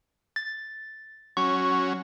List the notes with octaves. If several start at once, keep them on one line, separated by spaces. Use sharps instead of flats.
A6
F#3 C#4 C#6